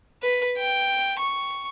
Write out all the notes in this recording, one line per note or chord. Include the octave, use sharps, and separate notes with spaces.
B4
G5
C#6